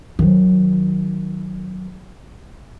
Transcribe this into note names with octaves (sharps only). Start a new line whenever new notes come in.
D#3 F#3